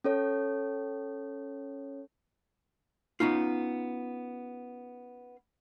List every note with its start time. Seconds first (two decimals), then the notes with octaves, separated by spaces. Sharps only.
0.04 C#4 A4 C#5
3.20 B3 C#4 D#4 F4